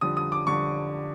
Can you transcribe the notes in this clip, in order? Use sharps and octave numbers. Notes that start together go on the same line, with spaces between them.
F2 D3 G3 D#6
D#6
D6
F2 D3 G3 C#6